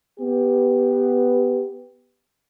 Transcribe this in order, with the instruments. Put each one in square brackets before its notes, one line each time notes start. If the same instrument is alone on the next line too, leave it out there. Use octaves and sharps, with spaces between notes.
[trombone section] B3 G4